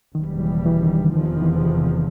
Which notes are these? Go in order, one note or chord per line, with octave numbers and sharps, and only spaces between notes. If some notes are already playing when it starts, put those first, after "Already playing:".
F#1 E2 B2 D#3 G3
E3
E3
D#3
D3
F1 E2 C3 D#3 F3
D#3
E3